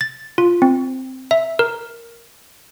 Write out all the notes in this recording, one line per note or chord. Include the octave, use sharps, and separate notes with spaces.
A6
F4
C4
E5
A#4